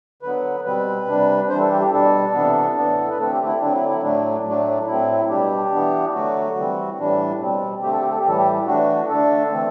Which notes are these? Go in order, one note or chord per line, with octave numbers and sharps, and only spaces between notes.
D3 F#3 B3 B4
B2 G3 C4 B4
C3 G3 D4
E3 G3 D4 C5
A4
G4
G4
B2 G3 D4 A4
C3 E3 B3 D4
A2 E3 B3 D4
B4
D3 A3 C4 A4
G4
E4
D3 F#3 C4 D4
E4
E4
A2 F#3 A3 D4
A2 F#3 A3 D4
A2 F#3 C4 E4
B2 G3 D4 G4
E3 B3 D4
D3 F#3 A3 F#4
E3 G3 C4
A2 E3 G3 D4
B2 G3 C4
D3 A3 C4 G4
A4
G4
A4
G4
A2 E3 G3 A4
G4
E3 A3 D4 F#4
D3 A3 D4 A4
E3 A3 C4